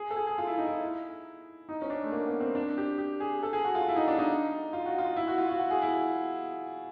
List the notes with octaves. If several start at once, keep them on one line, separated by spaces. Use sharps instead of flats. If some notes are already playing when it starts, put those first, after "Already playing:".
Already playing: G#4
A4
G#4
G#4
F4
E4
D#4
E4
D#4
C#4
D4
A3
A#3
B3
C4
D4
G4
G4
G#4
A4
G#4
F#4
F4
E4
D#4
D4
D#4
F4
F#4
F4
E4
F#4
F4
F#4
F#4
G#4
E4